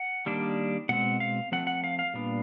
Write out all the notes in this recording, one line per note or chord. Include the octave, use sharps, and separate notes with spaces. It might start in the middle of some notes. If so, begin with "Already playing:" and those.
Already playing: F#5
D#3 G3 A#3 D4
B2 G#3 C4 F#5
F5
F3 A3 C4 F#5
F#5
F5
F5
A#2 G3 B3 D4